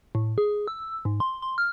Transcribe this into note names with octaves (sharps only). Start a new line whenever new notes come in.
A2
G#4
E6
G#2
C6
C6
F6